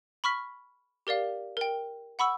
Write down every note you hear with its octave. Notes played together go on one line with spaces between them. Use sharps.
B5 C#6 F6 B6
G4 A#4 D5 F5
A#4 G5
F#5 B5 C#6 E6